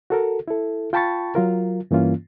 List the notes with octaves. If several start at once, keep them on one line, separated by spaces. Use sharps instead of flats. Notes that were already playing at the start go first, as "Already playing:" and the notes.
F#4 A4 A#4
E4 A4
F4 G5 A5 B5 C#6 A6
F#3 F4 A#4
G2 E3 A#3 C#4 F4